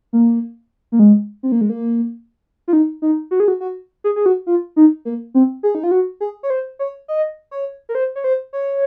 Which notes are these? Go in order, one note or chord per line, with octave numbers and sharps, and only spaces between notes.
A#3
A#3
G#3
C4
A#3
G#3
A#3
F4
D#4
D#4
F#4
G#4
F#4
F#4
G#4
G#4
F#4
F4
D#4
A#3
C4
G#4
D#4
F4
F#4
G#4
C#5
C5
C#5
D#5
C#5
A#4
C5
C#5
C5
C#5